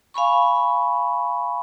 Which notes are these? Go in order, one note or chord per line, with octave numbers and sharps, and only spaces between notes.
F5 G#5 B5 C#6